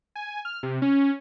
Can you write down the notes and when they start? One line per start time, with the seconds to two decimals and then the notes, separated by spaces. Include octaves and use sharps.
0.16 G#5
0.45 F6
0.63 C3
0.82 C#4